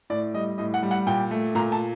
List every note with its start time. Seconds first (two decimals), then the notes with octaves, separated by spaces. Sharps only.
0.10 A2 D5
0.34 G3 D#5
0.58 A2 D#5
0.74 F#5
0.83 G3
0.91 F#5
1.07 A#2 G5
1.31 A3
1.55 A#2 A#5
1.72 A5